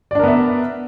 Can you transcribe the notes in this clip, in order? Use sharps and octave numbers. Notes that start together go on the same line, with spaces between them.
B3 D4 A#4 D5 E5